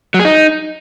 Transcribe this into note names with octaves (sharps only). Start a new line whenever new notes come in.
F#3
G#4
D#4